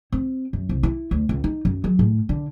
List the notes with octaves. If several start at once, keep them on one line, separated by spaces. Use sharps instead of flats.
C4
F#2
C2
E4
D2
C#2
D#4
F#2
F#3
A2
D3